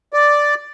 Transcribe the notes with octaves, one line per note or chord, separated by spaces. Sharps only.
D5